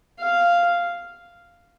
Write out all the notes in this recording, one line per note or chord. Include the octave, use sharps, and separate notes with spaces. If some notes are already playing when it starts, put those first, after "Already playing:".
F5